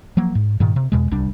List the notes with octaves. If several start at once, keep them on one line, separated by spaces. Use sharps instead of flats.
F3 F#3 A#3
G#2
G2 A#2 D#3
C3
E2 B2 G#3
D1 C2 G3 D4